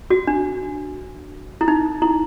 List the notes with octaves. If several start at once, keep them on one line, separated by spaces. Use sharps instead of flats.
F#4
D4
E4
D#4
E4